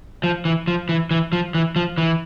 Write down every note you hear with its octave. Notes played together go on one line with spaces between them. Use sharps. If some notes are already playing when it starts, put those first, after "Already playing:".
F3
E3
F3
E3
E3
F3
E3
F3
E3